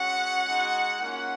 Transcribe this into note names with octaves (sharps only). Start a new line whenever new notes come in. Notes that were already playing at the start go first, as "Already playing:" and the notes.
Already playing: G#3 C#4 F#4 F#5
G#3 D#4 F#4
A#3 C#4 F4 F#5